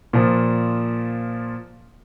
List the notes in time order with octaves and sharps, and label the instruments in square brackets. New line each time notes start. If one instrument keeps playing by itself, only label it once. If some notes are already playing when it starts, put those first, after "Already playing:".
[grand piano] A#2 F3